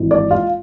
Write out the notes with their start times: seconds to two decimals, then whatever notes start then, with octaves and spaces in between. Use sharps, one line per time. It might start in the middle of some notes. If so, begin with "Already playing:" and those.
Already playing: G#1 G#2 E3
0.11 D5
0.31 F4